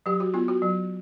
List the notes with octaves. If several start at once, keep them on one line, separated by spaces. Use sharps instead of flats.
F#3 G4
F#4
B3 F4
F#4
F#3